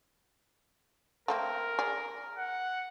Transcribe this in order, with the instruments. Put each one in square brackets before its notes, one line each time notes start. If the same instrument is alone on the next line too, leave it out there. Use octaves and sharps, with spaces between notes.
[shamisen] A3 A#3 C4 [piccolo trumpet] A#4
[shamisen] G#4 D5
[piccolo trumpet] F#5